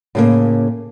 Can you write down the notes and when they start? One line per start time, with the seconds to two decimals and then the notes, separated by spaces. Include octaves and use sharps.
0.15 A2 C#3 A#3